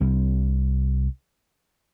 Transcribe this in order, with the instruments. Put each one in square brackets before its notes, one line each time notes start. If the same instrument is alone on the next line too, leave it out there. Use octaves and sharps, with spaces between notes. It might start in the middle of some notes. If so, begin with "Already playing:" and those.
[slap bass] C2 C3 G3 D4